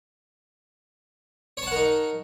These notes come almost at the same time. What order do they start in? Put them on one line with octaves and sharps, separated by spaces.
C#5 A5 F#5 A#4 D#4